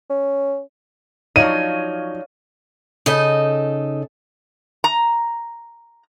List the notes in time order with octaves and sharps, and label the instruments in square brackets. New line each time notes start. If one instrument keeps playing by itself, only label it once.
[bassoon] C#4
[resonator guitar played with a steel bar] F3 F#3 D#4 [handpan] C#5 D5 F5 [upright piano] D#7
[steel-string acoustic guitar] C#3 D#4 A4 D#5
[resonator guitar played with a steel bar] A#5